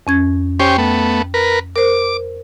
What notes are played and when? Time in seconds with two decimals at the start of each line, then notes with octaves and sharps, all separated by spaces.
0.07 F2 C#4 G#6
0.60 C#4 G4 C5 G5
0.78 A3 B3
1.34 A#4 B4
1.76 A#4 C5 D6